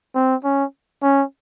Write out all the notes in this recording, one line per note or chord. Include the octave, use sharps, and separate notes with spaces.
C4
C#4
C#4